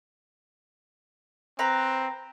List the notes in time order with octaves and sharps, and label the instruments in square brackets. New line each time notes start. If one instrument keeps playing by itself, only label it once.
[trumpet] C4 [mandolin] B4 A#5